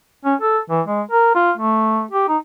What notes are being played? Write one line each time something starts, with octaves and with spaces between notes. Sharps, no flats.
C#4
A4
E3
G#3
A#4
F4
A3
G4
D#4